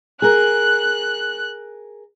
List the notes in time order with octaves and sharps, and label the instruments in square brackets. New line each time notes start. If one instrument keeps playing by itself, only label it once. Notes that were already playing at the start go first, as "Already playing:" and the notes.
[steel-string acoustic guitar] G#4 A#4 [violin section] F#6